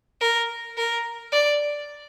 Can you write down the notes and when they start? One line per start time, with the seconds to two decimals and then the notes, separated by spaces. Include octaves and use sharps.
0.21 A#4
0.77 A#4
1.32 D5